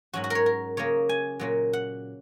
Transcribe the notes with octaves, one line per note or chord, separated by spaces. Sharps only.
G#2 F#3 C#4 F#4
F#4
A#4 C#5
A#4
C#3 F#3 A#3 C#4 C#5
G#5
A#2 F#3 A#3 C#4
F#5